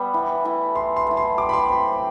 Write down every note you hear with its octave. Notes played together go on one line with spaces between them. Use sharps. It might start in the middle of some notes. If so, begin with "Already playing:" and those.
Already playing: G3 B3
E3
A3 E4
E3 C6
C6
A3 E4
C6
G3 D6
B5
C6
C4 G4 B5